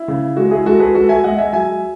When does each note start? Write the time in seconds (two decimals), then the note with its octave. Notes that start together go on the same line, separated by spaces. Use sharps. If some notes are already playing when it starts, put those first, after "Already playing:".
Already playing: E4
0.08 C#3
0.37 G#3 F#4
0.51 E4 G#4
0.66 G#3 F#4 A4
0.80 G#4 B4
0.95 G#3 F#4 A4
1.09 E5 G#5
1.24 G#3 D#5 F#5
1.38 E5 G#5
1.52 F#3 E5 G#5